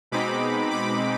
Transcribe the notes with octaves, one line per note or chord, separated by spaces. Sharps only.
B2 G#3 C4 D#4 B5 D6
B5 D6